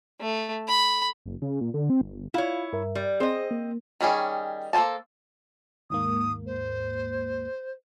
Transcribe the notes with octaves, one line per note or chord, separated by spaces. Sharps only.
A3
B5
F#1
C#3
A#2
D3
C4
G1
E4 F4 C#5 F5
G2 A#4 E5
G3
C4 G#4 C5 D#5
A#3
D#3 G3 C#4 G#4
A#3 A4 C5 G#5 A5
D#2 G#2 A#3 D#6
C5